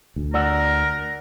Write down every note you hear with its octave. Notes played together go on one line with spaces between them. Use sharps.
D2
A#4 D5 F#5 E6